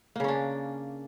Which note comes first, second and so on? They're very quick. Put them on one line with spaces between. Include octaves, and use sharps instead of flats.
A#3 C#3 C#4 D4